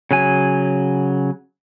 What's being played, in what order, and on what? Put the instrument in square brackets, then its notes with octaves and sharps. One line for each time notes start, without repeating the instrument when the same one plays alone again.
[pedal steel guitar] C#3 F#3 G#5